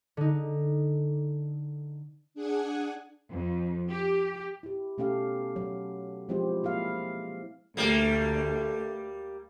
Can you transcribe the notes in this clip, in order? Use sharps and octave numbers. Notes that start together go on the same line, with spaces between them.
D3 D#4
D4 G#4 F#5 G#5
F2
G4
E4 G4
B2 A3 C#4 G4 A4 F5
F#3
F3 G#3 C4 E4 G4 C5
A#3 E4 G#4 F5
D2 G3 A3 A#3